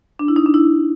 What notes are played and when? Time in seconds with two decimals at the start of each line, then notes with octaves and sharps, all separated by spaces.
0.19 D4
0.28 E4
0.36 D#4
0.46 D4
0.54 E4